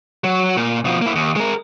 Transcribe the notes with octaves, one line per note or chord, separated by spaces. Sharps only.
F#3
A#2
B2 F3
A#3 E4
D#2
G#3 A#4